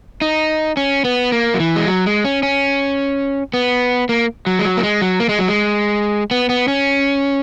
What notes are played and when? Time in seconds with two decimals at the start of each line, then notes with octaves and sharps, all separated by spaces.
0.21 D#4
0.77 C#4
1.05 B3
1.32 A#3
1.54 F#3
1.60 E3
1.76 G#3
1.87 F#3
2.06 G#3
2.25 C#4
2.43 C#4
3.54 B3
4.09 A#3
4.47 F#3
4.59 G#3
4.65 F#3
4.77 A#3
4.83 G#3
5.02 F#3
5.20 A#3
5.29 G#3
5.39 F#3
5.48 G#3
6.31 B3
6.49 B3
6.68 C#4